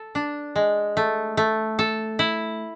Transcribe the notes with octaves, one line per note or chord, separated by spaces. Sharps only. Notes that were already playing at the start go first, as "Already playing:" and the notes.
Already playing: A4
D4
G#3
A3
A3
A4
E4